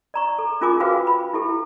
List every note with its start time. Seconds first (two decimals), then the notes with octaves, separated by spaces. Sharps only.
0.14 D5 A#5 C#6
0.39 A4
0.61 C#4 F4 G#4 A#4 G#5 D6
0.80 F#4 G#4 B4 C5 F5 G5
1.07 B5
1.33 E4 G4 A4